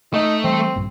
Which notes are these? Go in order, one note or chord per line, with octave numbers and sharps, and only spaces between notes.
A3 D#4
E3 G3 C4
A#1 G2